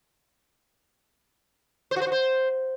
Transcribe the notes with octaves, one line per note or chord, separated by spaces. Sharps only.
C5
F#4
C5
F#4
C5